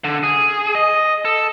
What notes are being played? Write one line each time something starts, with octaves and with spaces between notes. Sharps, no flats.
D3
G#4
D#5
A4